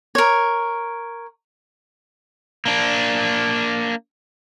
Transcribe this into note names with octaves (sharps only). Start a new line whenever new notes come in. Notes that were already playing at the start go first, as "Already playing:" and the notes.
A#4 C#5
A#3 D4